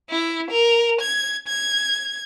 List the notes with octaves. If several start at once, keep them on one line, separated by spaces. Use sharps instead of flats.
E4
A#4
G#6
G#6